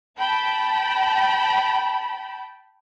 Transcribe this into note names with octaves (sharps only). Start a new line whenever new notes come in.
G5 A5 B5